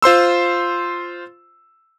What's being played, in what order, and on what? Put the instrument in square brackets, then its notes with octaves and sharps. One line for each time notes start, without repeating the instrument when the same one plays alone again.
[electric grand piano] F4 C5 C6 E6